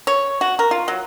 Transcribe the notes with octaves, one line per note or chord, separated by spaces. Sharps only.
C#5
F#4
A#4
F4
F#3